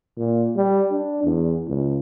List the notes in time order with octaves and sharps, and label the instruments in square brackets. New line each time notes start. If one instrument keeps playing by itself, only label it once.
[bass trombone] A#2
G3
D4
E2
C#2